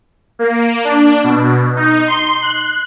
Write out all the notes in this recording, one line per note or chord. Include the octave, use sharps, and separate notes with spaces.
A#3
D4
B2
D#4
C6
F#6